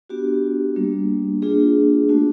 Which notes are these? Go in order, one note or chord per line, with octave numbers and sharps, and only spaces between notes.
B3 D4 F#4 G4
G3 A#3 D4
A#3 D4 F4 G#4
A3 D4 F#4